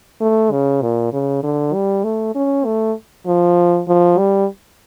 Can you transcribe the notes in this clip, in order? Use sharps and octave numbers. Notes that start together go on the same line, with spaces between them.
A3
C#3
A#2
C#3
D3
G3
A3
C#4
A3
F3
F3
G3